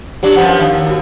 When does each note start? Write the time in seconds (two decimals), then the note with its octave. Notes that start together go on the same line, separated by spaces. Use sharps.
0.23 F#3 D4 G4
0.36 F#2 F3 B3 F#5 D#6
0.60 D#2 F5
0.86 E4 F#4